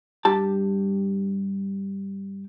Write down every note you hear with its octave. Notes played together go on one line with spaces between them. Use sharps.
G2 G4 A5